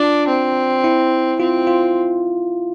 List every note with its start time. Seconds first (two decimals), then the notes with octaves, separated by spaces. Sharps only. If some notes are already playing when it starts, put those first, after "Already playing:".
Already playing: D4 F4
0.28 C4
0.84 E4
1.40 C4 F4
1.67 F4